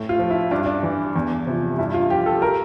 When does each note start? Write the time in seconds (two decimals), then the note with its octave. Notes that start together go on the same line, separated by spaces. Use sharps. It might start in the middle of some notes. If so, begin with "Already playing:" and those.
Already playing: A2
0.09 F4
0.19 F3
0.30 E4
0.51 G2 D4
0.66 D4
0.83 E3
1.16 E2
1.47 C3 F3
1.78 G2 E4
1.94 F4
2.10 F3 G4
2.26 A4
2.42 A#4